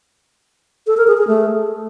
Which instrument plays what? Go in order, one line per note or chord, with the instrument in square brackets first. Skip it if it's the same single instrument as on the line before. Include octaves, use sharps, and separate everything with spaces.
[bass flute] A4
A#4
G#4
G#4
A3